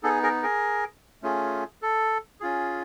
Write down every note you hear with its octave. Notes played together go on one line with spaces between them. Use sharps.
B3 D#4 G#4 A4
G#4 A#4
G#4 A#4
A3 C#4 F4 G#4
A4
C#4 F4 G#4